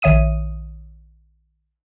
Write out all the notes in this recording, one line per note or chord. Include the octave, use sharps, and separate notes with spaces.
A#1 D#3 C#5 E5 D#6 D#7